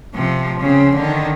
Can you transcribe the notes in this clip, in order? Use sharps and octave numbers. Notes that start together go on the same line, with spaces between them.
C3 F3
C#3 C4
D3 D#3